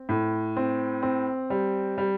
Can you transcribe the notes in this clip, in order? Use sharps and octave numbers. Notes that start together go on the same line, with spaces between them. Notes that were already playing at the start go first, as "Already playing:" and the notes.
Already playing: C4
A2
C4
C4
G3
G3